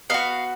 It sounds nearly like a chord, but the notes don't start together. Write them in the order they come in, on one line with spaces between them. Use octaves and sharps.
B3 D#4 F5 F#4